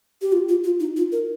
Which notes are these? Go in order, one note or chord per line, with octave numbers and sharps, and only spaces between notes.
G4
F4
F4
F4
D#4
F4
A#4